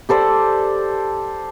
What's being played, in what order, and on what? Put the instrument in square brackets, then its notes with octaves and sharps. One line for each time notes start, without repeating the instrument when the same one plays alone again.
[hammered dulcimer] G4 A4 C5 D5